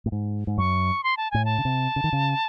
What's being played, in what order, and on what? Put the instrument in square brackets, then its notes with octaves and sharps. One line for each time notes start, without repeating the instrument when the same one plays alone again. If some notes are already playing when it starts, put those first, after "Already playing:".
[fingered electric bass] A2
G#2
G#2
[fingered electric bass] F#2 [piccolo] C#6
[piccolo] C6
A5
[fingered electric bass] A2 [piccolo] G#5
[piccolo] A5
[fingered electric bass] C#3
C3
C#3
D#3
C#3